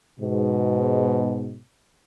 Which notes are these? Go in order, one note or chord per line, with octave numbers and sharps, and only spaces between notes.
G#2 B2